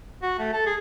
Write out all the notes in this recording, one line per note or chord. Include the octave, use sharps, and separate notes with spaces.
F#4
A3
A4
G#4